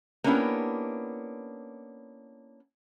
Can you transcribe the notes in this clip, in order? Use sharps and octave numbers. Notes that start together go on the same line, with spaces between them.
A#3 B3 C#4 D4 E4 G4